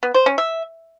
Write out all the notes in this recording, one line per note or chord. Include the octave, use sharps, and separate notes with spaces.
B3
C5
C#4
E5